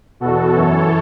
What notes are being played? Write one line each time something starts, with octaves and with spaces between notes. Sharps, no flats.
E2 B2 F#4 A4
F#2 E3 A4 C#5